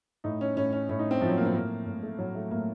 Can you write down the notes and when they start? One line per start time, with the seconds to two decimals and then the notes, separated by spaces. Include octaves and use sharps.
0.24 A2 D#4
0.41 C#4
0.56 A2 C#4
0.73 C#4
0.89 A2 C#4
0.99 D#4
1.11 C4
1.21 A2 F3
1.29 F#3
1.37 A#3
1.46 C4
1.54 A2 A#3
1.86 A2
2.03 A3
2.18 A2 F#3
2.35 A3
2.51 A2 A#3